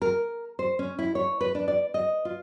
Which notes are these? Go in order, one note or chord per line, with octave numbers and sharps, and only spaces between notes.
A#4
C5
C#4
E4
C#5
B4
D4
D5
D#5
F4